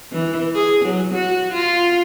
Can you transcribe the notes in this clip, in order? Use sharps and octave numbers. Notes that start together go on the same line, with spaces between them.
E3
G#4
F#3
F#4
F4